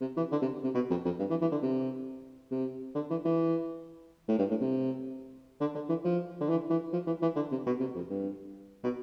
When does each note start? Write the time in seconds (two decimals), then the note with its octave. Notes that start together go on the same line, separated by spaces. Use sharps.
0.01 C3
0.17 E3
0.32 D3
0.42 C3
0.63 C3
0.75 B2
0.90 F2
1.05 F2
1.19 G2
1.30 E3
1.41 E3
1.52 D3
1.63 C3
2.52 C3
2.95 D3
3.10 E3
3.25 E3
4.28 A2
4.38 G2
4.50 A2
4.61 C3
5.61 D3
5.75 D3
5.89 E3
6.05 F3
6.41 D3
6.49 E3
6.70 E3
6.93 F3
7.07 E3
7.22 E3
7.36 D3
7.51 C3
7.66 B2
7.80 C3
7.95 F2
8.10 G2
8.84 B2